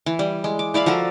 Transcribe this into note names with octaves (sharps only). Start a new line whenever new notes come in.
E3
G3
G#3
D6
E4 D5 F5 B5
F3 F#4 A4 A#4